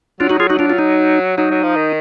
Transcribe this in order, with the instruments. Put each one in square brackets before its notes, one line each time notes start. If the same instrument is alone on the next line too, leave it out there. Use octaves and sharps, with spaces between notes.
[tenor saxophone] F#3 [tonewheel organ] D4 F4
[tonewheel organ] D#4 F#4
F4 G#4
D#4 F#4
D4 F4
F4
D#4
[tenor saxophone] F#3 [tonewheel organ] D#4
[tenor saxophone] F#3
F3
D#3